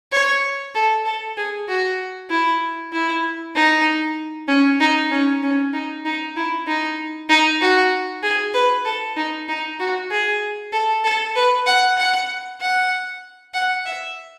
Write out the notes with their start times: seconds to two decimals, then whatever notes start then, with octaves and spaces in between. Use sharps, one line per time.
0.12 C#5
0.75 A4
1.05 A4
1.37 G#4
1.69 F#4
2.30 E4
2.93 E4
3.56 D#4
4.48 C#4
4.80 D#4
5.11 C#4
5.43 C#4
5.73 D#4
6.05 D#4
6.36 E4
6.67 D#4
7.30 D#4
7.61 F#4
8.23 G#4
8.54 B4
8.85 A4
9.17 D#4
9.49 D#4
9.80 F#4
10.11 G#4
10.72 A4
11.04 A4
11.36 B4
11.66 F#5
11.97 F#5
12.61 F#5
13.54 F#5
13.86 E5